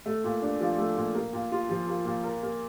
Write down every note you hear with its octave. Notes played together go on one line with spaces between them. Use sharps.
A3
A#2
D4
F3
A3
A#2
A#3
A#2
F4
F3
A#3
A#2
A#4
A#3